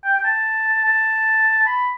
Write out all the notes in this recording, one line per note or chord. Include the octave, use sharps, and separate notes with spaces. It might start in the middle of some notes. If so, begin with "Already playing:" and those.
G5
G5
A5
A5
B5